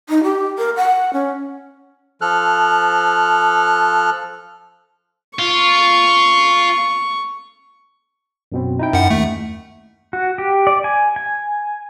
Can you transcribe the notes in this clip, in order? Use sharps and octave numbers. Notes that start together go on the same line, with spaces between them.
D#4
G4
A#4
F#5
C#4
F3 A4 F6 F#6
F4 C#6
F#2 B2 C4
D#4 E4 G5
F#2 F#5
D#2 A3
F#4
G4
D5
G#5
G#5